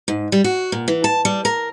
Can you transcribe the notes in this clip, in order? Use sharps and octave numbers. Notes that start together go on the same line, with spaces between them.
G#2
G3
F#4
A#2
E3
A5
G3
A#4